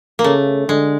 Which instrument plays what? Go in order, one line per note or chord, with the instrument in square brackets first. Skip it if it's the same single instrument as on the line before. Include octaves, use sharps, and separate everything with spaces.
[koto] A#3
[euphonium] C#3 [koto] A3
[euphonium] D3 [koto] G#3